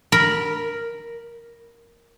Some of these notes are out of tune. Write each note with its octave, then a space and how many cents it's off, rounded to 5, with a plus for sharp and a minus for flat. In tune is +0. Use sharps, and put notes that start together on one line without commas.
A#4 +0 B5 -20